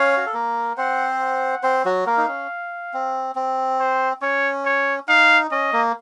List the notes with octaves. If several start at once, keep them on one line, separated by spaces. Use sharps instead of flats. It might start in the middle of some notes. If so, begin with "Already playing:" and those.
Already playing: C#4 C#5 F5
F#4
A4
A#3 A#4
C4 C5 F#5
F#5
C4 C5
F#3 F#4
A#3 A#4 F5
D#4
C#4
C4
C4
C5
C#4 C#5
C#5
D#4 F5
C#4 D#5
A#3